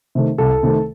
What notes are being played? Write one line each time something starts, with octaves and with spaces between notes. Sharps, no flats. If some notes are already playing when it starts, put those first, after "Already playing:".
C3 D#3 A3
C2 A4
C3 D#3 A3